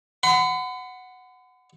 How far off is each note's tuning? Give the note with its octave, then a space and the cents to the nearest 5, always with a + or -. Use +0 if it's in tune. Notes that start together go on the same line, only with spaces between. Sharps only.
F#5 +0 B5 +45